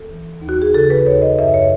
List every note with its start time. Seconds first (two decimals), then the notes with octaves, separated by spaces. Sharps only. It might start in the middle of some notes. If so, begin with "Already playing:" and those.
Already playing: D#2 A4
0.10 E3
0.42 D#2
0.49 F#4
0.62 G#4
0.74 C#3 A4
0.90 B4
1.06 D#2 C#5
1.22 D#5
1.39 F#2 E5
1.54 C#5